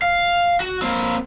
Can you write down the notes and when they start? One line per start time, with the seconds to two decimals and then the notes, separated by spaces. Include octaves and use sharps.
0.02 F5
0.60 F#4
0.82 A#3 C4